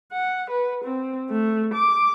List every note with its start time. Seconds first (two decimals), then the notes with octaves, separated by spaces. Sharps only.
0.13 F#5
0.50 B4
0.85 C4
1.30 A3
1.74 D6